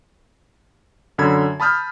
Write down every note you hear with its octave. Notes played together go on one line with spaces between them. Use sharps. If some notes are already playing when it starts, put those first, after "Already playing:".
F#2 D3 B5 G#6
A5 B5 D#6 F6 G6